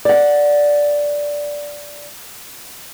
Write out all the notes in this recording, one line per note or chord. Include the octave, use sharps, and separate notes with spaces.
D5 F#5